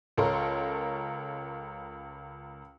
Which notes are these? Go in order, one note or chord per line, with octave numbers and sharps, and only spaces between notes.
C#2 A4 A#4 C#5 A#5 C6